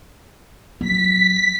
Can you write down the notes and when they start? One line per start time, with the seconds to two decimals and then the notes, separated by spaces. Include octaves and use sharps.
0.81 F#3 B6